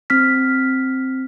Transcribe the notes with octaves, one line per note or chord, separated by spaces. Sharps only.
C4 F6 B6